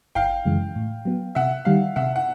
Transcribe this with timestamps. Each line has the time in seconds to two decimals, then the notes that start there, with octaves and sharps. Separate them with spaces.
0.15 G1 F5 G5
0.45 F#2 C#3 E3 G#3
0.76 A2
1.05 F#3 B3
1.35 C3 E5 F#5
1.65 D#3 G3 F5
1.96 C3 E5 F#5
2.16 F#5